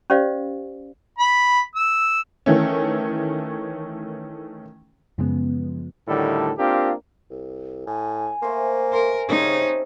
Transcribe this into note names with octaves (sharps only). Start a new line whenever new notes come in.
C#4 G4 C5 D5 F5
B5
E6
D#3 E3 A3 C#4
F#2 C#3 F3 G#3 B3
D2 A2 D3 D#3 G3 A4
A#3 C4 D4 F4 G4 A#4
C2
A2 G#5
A3 A#3 C5
A#4 C6
C#3 G3 C4 C#4 D#4 A4